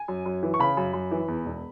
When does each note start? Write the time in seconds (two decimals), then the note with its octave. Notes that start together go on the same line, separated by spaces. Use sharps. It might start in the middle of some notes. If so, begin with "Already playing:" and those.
Already playing: G#5
0.08 F#2
0.26 F#2
0.43 E3
0.54 C#6
0.59 C#3 B5
0.77 F#2
0.94 F#2
1.11 E3
1.28 E2
1.46 E1